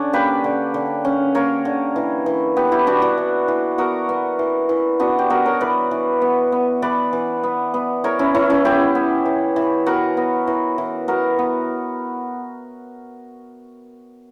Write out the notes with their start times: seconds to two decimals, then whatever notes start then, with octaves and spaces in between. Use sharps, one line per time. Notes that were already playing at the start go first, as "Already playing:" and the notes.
Already playing: D3 C#4 D4
0.13 A#3 G4 B4
0.44 D3
0.74 D3
1.05 C#4
1.35 A#3 A#4 C#5
1.65 D3
1.96 E3
2.26 E3
2.56 B3 G4 B4
2.72 E4 G4
2.87 B3 D4 F#4
3.02 D4 F#4
3.18 E3
3.48 E3
3.78 B3 F#4 A#4
4.09 B3
4.39 E3
4.69 E3
5.00 B3 D4 F#4
5.19 G4
5.30 B3 F#4 A#4
5.45 A#4 C#5
5.61 E3 B4 D5
5.91 E3
6.22 B3
6.52 B3
6.82 E3 B4 D5
7.13 E3
7.43 B3
7.74 B3
8.04 E3 A#4 C#5
8.19 C#4 E4
8.35 E3 C#4 E4
8.50 C#4 E4
8.65 B3 E4 G4
8.95 B3
9.26 E3
9.56 E3
9.86 B3 F#4 A#4
10.17 B3
10.47 E3
10.78 E3
11.08 B3 F#4 A#4
11.39 B3